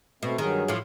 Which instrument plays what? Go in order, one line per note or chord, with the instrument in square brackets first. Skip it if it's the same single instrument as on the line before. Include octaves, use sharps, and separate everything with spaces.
[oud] B2 [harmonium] A3 C4
[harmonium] G2 F#3 G#4 [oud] D#3
[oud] A2 F3